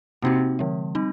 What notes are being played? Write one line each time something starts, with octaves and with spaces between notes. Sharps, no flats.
C3 A#3 D#4 F#4
D3 F3 G#3
G3 C4 D#4